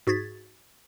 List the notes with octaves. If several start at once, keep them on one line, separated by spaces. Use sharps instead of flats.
G#2 F#4 G#4 G#6 A6 B6